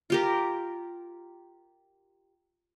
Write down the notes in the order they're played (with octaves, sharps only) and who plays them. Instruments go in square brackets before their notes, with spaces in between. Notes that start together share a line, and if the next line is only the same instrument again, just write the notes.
[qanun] F4 G4 A#4